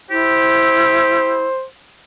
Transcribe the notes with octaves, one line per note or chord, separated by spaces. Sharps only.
E4 G4 C5